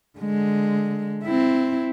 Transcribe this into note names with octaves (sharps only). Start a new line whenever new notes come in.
D3 G#3
C4 E4